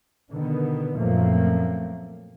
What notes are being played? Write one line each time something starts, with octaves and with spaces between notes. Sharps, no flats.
B2 D3 D#3 B3
F#2 A#2 F3 A3 A#3 C4